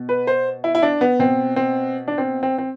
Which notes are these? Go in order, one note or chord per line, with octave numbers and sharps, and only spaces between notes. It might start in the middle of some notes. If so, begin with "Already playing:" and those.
Already playing: B2
B4
C5
E4
E4
D4
B3
B2 C4
C4
D4
C4
C4
C4